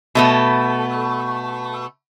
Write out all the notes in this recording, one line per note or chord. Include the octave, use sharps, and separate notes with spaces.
B2 A3 B3